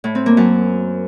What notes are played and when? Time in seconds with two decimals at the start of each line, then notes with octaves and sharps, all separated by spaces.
0.04 A2
0.15 C4
0.26 A#3
0.37 F#2